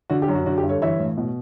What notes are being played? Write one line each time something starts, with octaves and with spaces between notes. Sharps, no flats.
D3 F#4
G4
F#2
F#4
D3 F#4
G4
G2
A4 C#5
E3 C#5 E5
A2
B2